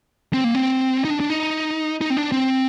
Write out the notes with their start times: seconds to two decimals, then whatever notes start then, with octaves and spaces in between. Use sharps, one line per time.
0.34 C4
0.44 A#3
0.55 C4
1.05 D#4
1.10 D4
1.20 D4
1.30 D#4
2.01 D#4
2.10 C4
2.17 D4
2.32 C4